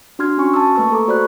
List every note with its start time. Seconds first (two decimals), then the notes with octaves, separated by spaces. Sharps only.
0.19 D4 F#4 C6 F6 G#6
0.38 C#4 F#4 G#5 C#6
0.54 A5 E6
0.76 A3 A#3 B4 C#6 E6
0.92 A4 A#5 D6
1.08 F#4 C5 D5 B5 C#6 F#6